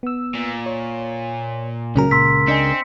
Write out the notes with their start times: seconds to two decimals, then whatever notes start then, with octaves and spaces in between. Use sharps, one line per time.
0.03 B3 E6
0.35 A#2
0.66 C#5
1.96 C#2 C#3 F#3 C#4 A#4
2.11 A#2 C6 E6 B6
2.48 C4 D4 D#5 G#5 C#7